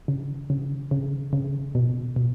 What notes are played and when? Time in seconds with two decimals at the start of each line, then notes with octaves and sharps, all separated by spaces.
0.08 C#3
0.50 C#3
0.91 C#3
1.33 C#3
1.75 B2
2.16 B2